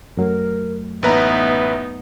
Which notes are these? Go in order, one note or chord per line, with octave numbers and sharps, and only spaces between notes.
F#2 F#3 A3 A#4
A1 B3 D#4 B4 E5 A#5